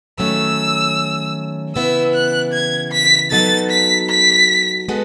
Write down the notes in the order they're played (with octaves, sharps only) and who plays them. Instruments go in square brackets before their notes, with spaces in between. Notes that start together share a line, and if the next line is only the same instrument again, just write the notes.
[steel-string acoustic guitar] D#3 F#3 A3 C#4 [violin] E6
[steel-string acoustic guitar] C#3 E3 B3 E4 [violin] E6
[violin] F#6
G#6
B6
[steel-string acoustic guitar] F#3 B3 D#4 F#4 A4 [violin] A6
[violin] B6
B6
[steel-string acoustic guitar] G#3 B3 F#4 A4